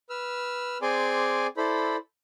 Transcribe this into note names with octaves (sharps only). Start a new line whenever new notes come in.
B4 E6 F6
C4 G#4 D5 G#5 C6 D6
E4 A4 C5 D5 B5